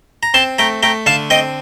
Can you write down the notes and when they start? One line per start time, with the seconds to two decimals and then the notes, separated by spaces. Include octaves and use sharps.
0.23 A#5
0.34 C4 A5 C6
0.58 A3 G5 A#5
0.83 A3 G5 A#5
1.06 D3 F5 A5
1.30 C4 D#5 G5